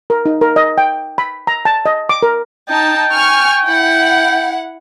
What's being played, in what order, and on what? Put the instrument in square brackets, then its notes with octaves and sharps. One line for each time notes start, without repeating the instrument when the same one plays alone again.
[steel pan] A#4
D#4
A#4
D#5
G5
B5
A#5
A5
D#5
D6
A#4
[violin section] D#4 A5 [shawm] G5
[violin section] G#5 C#6 F6
E4 F#5